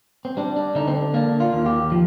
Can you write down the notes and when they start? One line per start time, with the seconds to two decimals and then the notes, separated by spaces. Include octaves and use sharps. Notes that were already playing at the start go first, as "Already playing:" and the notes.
0.25 C4
0.37 G3 D4
0.56 D4
0.75 D3 D#4
0.88 C4
0.95 D4
1.14 A#3 D4
1.40 F4
1.53 D#2
1.66 G4
1.92 F3